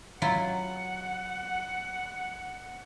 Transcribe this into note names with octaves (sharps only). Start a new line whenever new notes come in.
F#3 E4 F4 F#5